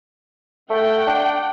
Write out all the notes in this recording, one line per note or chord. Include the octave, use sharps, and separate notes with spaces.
A3 F#5 G5
D4